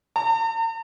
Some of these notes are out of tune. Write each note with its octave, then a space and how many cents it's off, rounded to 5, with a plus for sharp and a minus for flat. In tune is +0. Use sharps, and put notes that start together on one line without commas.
A#5 -45